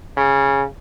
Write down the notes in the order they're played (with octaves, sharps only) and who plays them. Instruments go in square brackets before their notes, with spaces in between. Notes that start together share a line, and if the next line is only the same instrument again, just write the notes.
[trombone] C#3